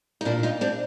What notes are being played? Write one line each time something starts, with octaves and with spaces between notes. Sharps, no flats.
D#4
A#2 D4 E4
D#4 F4
C4 D4